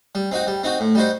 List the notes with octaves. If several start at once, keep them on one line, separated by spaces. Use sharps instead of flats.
G3
C4 D#4 F#4
G3
C4 D#4 F#4
A2
G3 D#4 F#4 C5